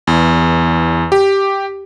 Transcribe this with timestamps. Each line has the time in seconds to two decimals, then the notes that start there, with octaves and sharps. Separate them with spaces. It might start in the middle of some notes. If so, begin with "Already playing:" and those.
0.07 E2
1.12 G4